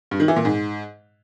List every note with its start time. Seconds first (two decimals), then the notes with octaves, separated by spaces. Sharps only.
0.11 G2
0.20 D#3
0.28 E3
0.37 A#2
0.45 G#2